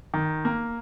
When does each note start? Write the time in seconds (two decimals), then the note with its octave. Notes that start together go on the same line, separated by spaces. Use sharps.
0.14 D#3
0.45 A#3